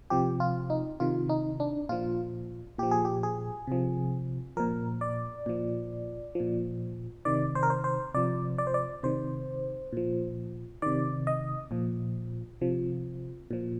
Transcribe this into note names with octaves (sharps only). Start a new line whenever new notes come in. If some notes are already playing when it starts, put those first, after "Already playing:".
C3 F3 G4
F4
D#4
C3 D#3 F4
D#4
D4
A#2 F3 F4
A#2 F3 G4
G#4
G4
G#4
C3 F3
A#2 F3 A#4
D5
A#2 F3
A#2 F3
C3 D#3 D5
C5
A#4
C5
C5
C3 F3 D5
D5
C5
D5
C3 D#3 C5
A#2 F3
C3 D#3 D5
D#5
A#2 F3
C3 F3
A#2 F3